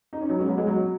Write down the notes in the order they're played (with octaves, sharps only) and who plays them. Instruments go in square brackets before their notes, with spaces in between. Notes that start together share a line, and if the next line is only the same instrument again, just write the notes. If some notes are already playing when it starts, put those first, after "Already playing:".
[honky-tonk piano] D#4
C#4
F#3 B3
G#3 C#4
F#3 B3
G#3
F#3